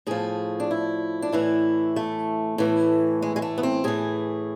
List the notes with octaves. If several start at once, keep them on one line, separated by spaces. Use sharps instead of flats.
A2 F3 G#4
D4
E4
D4
A2 E3 E4
A3
A2 E3
G#3
G#3
A3
B3
C4
A2 E3 G#4